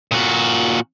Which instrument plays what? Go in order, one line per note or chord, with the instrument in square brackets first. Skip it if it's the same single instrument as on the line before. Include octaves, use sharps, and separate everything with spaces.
[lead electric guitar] A#2 F#4